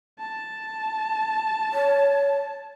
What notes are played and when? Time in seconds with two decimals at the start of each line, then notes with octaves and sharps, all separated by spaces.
0.19 A5
1.73 C#5